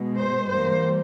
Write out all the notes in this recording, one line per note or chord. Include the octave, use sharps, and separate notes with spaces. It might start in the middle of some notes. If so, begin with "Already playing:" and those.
Already playing: B2 G#3
C5
G2 E3 G3 A#3 C5